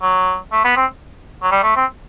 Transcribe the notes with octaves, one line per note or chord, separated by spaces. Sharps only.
F#3
A3
B3
C4
F#3
G3
A3
C4